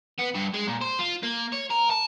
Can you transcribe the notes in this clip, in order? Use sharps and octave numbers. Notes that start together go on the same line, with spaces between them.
B3
G2
G#3
A#2
C5
F4
A#3
C#5
A#4
A5